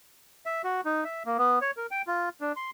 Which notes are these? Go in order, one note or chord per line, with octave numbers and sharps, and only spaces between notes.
E5
F#4
D#4
E5
A#3
B3
C#5
A#4
G5
F4
D4
C6